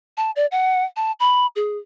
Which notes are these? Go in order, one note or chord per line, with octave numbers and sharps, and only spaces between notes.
A5
D5
F#5
A5
B5
G#4